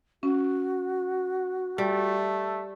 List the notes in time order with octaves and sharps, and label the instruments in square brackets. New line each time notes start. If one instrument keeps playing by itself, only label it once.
[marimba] C#4 [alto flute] F#4
[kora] G3 [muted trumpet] A3